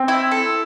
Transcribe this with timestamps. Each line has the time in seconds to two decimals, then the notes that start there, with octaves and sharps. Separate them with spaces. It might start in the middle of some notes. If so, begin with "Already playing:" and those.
Already playing: C4 G5
0.08 E4
0.31 A4